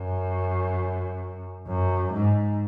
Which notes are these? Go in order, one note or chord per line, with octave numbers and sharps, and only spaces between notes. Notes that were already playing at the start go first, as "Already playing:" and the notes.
Already playing: F#2
F#2
G#2